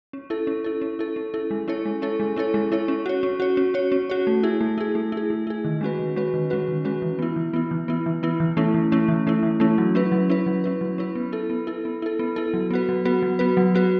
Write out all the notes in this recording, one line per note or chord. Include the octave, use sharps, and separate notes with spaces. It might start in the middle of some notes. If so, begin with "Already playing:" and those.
C#4
E4 A4
C#4
E4 A4
C#4
E4 A4
C#4
E4 A4
G#3
C#4 E4 A4 C#5
G#3
C#4 E4 A4 C#5
G#3
C#4 E4 A4 C#5
G#3
C#4 E4 A4 C#5
C#4
F#4 C#5
C#4
F#4 C#5
C#4
F#4 C#5
C#4
F#4 C#5
A3
E4 G#4
A3
E4 G#4
A3
E4 G#4
A3
E4 G#4
D#3
G#3 C#4 F#4 B4
D#3
G#3 C#4 F#4 B4
D#3
G#3 C#4 F#4 B4
D#3
G#3 C#4 F#4 B4
E3
B3 E4
E3
B3 E4
E3
B3 E4
E3
B3 E4
E3
A3 C#4 E4
E3
A3 C#4 E4
E3
A3 C#4 E4
E3
A3 C#4 E4
F#3
C#4 E4 B4
F#3
C#4 E4 B4
F#3
C#4 E4 B4
F#3
C#4 E4 B4
B3
E4 A4
B3
E4 A4
B3
E4 A4
B3
E4 A4
F#3
B3 F#4 B4
F#3
B3 F#4 B4
F#3
B3 F#4 B4
F#3
B3 F#4 B4